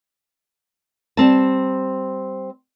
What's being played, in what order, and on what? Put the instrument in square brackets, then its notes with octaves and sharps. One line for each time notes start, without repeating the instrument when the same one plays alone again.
[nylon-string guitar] G3 C4 A5